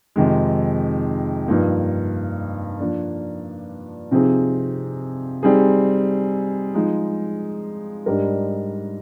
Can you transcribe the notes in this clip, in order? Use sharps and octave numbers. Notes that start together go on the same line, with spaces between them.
F2 C3 D#3 G#3
G2 F3 A#3 D#4
F3 A#3 D4
C3 F3 C4 D#4 G#4
G3 C4 D#4 G#4
F3 G#3 D#4
G#2 G3 D4 G4 A#4